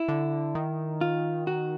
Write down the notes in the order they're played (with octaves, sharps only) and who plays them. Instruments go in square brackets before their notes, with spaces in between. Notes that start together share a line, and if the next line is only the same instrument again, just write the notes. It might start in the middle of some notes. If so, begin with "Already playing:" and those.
Already playing: [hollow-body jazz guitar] E4
[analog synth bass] D3
D#3
[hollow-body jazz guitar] F4
F#4